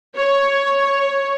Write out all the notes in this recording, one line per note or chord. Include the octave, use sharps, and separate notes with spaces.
C#5